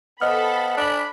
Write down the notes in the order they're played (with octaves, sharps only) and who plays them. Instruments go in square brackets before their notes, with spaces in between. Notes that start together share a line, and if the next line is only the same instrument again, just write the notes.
[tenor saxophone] B3 [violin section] A4 B5 [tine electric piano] C5 D#5 F6
[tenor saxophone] D4 [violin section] B5